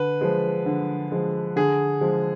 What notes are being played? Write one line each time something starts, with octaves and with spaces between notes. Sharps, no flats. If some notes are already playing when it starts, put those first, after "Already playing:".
Already playing: D3 B4
F3 G#3
D3
F3 G#3
D3 G#4
F3 G#3